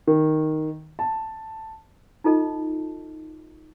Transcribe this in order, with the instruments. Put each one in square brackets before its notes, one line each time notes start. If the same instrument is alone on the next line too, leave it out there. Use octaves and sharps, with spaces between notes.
[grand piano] D#3
A5
[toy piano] D#4 F4 A4 D#5 A5